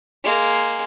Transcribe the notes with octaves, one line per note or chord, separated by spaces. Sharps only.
G#3 A#3